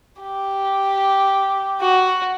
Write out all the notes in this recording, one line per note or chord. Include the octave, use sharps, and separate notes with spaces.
G4
F#4